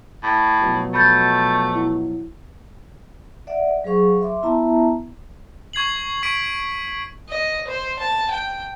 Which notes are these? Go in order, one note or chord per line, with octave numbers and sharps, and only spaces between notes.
A2
B2 F3 F#3
A3 B5 G6 A6
E4
D5 E5 F#5
F#3 G#4 C5 F5 C#6
E5 C6 D6
B3 E4 E5 A5 A#5
C#6 G#6 C7 F#7
C#6 B6 D7
D#5
C5
A5
G5